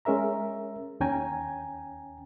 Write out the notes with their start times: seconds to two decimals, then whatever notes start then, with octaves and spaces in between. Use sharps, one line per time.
0.05 G#3 C#4 A#4 E5 A#5
1.00 D#2 C#4 G5 G#5 A#5